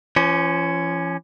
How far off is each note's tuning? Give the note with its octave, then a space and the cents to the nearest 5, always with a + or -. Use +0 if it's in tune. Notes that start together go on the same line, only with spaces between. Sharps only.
F3 -45 C#4 +0